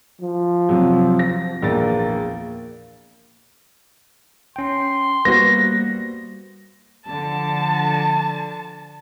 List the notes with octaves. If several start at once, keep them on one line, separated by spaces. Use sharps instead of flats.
F3
C3 F#3
A#6
A#1 E2 A#3 A6
C#4 G5 C6
G3 A#3 B3 F#4 C5 A#6
D3 F3 A5